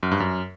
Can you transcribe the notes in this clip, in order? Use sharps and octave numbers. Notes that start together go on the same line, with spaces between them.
F#2
G2
F#2